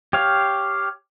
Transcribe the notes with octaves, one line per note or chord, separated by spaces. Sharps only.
G4 C#5 F5